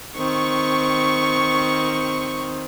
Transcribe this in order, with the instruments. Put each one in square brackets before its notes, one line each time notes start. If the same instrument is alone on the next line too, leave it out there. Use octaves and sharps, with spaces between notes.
[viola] D#3 C4 [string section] C#6